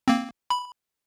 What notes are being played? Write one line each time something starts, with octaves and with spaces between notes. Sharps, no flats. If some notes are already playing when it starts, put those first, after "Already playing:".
A#3 C4
B5